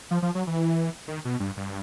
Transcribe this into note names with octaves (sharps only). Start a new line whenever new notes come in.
F3
F3
F#3
E3
D#3
B2
G2
G2